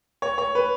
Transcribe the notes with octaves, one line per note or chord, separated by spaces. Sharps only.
C#5
C#5
B4